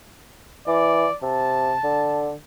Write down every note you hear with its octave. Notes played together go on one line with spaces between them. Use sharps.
E3 D5
C3 A5
D3